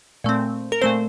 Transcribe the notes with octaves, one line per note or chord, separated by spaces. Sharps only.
A#2 A3 C4
A#4
A#2 A3 C4 C5